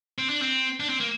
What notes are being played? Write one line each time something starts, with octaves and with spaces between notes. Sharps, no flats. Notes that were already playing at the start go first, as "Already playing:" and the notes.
C4
D4
C4
D4
C4
A#3